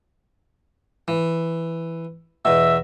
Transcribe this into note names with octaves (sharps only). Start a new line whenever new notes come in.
E3
E2 B2 E5